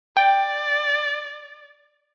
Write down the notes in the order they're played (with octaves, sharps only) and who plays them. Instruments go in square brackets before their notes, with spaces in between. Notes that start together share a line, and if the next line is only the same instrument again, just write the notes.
[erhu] D5 [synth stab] G5